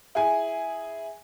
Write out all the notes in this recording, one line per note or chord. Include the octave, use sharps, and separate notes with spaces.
E4 G#4 G#5